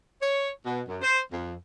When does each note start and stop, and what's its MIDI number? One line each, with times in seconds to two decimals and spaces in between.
0.22 0.49 73
0.65 0.81 47
0.88 0.97 42
1.01 1.21 72
1.32 1.54 41